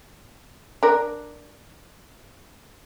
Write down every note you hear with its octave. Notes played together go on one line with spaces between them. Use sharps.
D4 A#4